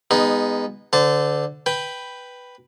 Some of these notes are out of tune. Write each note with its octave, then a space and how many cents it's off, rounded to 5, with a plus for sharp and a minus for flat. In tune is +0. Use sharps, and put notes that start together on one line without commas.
G#3 -30 B3 +0 D#4 +0
D3 +0 C5 -30 A5 +0
B4 +0 G5 +0